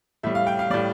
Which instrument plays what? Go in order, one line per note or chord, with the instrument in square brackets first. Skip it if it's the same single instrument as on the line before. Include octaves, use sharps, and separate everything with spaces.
[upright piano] A2 G3 E5
F5
G5
F5
A2 G3 D5